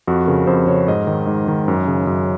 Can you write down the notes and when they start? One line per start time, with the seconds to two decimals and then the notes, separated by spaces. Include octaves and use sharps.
0.07 F2 F#4
0.27 C#3 A#4
0.47 F2 C5
0.67 C#3 C#5
0.88 G#2 D#5
1.07 D#3
1.27 G#2
1.48 D#3
1.68 F#2
1.87 C#3
2.07 F#2